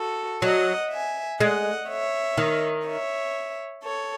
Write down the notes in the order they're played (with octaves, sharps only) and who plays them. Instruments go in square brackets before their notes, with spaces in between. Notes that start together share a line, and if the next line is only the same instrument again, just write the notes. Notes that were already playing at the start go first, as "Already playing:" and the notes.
Already playing: [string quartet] F#4 A4
[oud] F#3 [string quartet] D#5 F#5
[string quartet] E5 G#5
[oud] G#3 [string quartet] D#5 F#5
[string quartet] C#5 E5
[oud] D#3
[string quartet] C#5 E5
A4 C#5